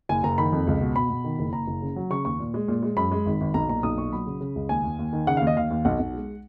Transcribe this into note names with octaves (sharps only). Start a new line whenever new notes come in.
F#1 G#5
F#1 A#5
D#3 B5
F2
C#2
B2
B2 B5
B2
D#3
F#1
F#1 A#5
F#1
C#3
F#3
C#3 C#6
D#2 C#6
A#2
G#3
A#2
G#3
F#2 B5
G#3
G#1
G#1
B1 A#5
A#2 A#5
B1 D#6
A#2 C#6
F#3 B5
C#3
C#3
C#2
D#2 G#5
D#2
D#2
D#3
C#3 F#5
D#2 F5
D#5
D#2 F5
D#2
B1 F#5
B1
G#3